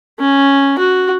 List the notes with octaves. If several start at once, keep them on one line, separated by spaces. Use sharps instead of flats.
C#4
F#4